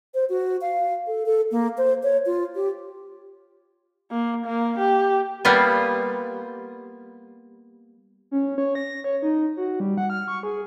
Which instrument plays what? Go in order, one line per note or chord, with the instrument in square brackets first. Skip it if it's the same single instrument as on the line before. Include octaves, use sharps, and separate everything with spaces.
[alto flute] C5
F#4
F5
A4
A4
A#3
C5
C#5
F4
G4
[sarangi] A#3
A#3
G4
[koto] G3 A#3 B3 F4
[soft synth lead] C#4
C#5
A#6
C#5
D#4
F#4
G3
F#5
F6
C#6
G#4